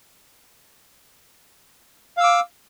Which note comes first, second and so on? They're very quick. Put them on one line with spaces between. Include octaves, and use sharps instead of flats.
F5 E6 D6